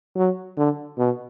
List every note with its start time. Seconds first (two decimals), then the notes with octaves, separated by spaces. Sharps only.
0.16 F#3
0.57 D3
0.98 B2